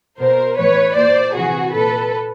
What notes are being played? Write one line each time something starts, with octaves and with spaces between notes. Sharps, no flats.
B2 A#4 C5
A2 E3 B4 C#5
A#2 C5 D5
C3 E3 F#4 G#4
A#2 A4 B4